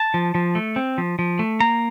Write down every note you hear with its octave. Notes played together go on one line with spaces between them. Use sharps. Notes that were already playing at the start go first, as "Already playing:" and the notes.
Already playing: A5
F3
F3
A3
C4
F3
F3
A3
A#3 A#5